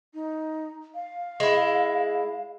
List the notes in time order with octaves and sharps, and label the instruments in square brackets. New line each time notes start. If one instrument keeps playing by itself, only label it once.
[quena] D#4
F5
[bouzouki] G#3 E4